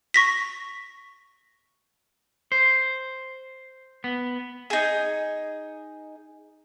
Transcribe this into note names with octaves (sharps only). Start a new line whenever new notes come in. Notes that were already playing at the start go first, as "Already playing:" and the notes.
C#6 A#6 B6
C5
B3
D#4 G#4